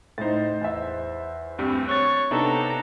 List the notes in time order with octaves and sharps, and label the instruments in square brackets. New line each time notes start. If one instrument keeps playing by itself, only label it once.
[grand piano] A2 D#4 [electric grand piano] C5 A6
[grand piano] E2 E5
[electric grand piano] D2 G2 G3 [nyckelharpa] C4
[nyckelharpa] C#5 C#6 [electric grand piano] F#6 A6
[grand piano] C3 [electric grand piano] B3 D4 D#4 [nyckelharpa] A4 A#5